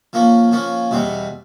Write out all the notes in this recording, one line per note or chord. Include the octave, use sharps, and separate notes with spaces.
F3 A#3 C#4
F3 A#3 C#4
E2 B2 G3 C4